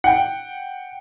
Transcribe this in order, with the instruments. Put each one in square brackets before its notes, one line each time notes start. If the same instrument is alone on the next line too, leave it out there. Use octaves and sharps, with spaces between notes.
[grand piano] F#5 G5